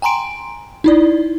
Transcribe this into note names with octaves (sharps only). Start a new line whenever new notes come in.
G5 G#5 A#5 C6 D7
D#4 E4 D5